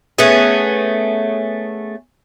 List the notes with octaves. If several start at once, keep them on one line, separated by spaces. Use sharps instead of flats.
A3 B3 C#4 G#4